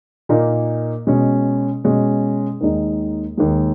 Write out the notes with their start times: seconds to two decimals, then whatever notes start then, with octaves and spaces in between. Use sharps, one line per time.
0.29 A#2 A#3 D#4
1.07 B2 G#3 C#4
1.84 B2 G#3 C#4
2.61 D#2 D#3 G#3 D#4
3.37 D#2 D#3 G#3 D#4